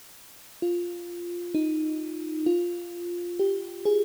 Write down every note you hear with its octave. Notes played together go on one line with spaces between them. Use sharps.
F4
D#4
F4
G4
G#4